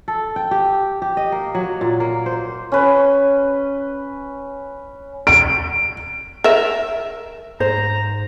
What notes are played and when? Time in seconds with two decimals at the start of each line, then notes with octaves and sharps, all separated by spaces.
0.08 A4
0.36 G5
0.51 G4
1.02 G4
1.17 D#5
1.32 A#3
1.55 F#3
1.81 A#2
2.00 A#3
2.26 C5
2.72 C#4 B4
5.27 D7
6.44 A#4 E5
7.60 G#2 C5 A#5